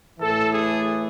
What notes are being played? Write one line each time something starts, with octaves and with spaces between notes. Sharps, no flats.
A2 E3 A4
G#4